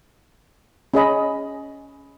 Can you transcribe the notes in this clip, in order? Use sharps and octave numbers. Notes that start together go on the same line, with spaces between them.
C#4 G#4 D#5 B5